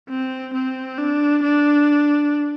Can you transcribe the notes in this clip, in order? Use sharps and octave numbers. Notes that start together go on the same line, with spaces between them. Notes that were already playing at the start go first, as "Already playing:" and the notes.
C4
C4
D4
D4